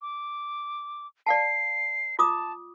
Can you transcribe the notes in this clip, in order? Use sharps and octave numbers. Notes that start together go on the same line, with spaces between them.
D6
D5 F5 A5 C7
F4 A5 D6 D#6